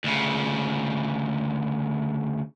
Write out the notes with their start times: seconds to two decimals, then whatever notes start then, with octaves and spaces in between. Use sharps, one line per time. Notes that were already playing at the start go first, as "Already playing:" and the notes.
0.04 D2 C#3